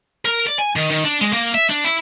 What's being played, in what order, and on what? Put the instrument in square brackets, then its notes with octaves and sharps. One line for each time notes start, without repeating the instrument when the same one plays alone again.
[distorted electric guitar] A#4
D5
G#5
D#3
D#3
D4
G#3
A#3
E5
D4
E4